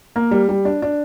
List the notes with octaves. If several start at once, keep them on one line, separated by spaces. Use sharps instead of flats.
A#3
G3
G3
D4
D4